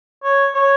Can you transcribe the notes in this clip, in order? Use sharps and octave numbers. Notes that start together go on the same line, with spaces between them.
C#5
C#5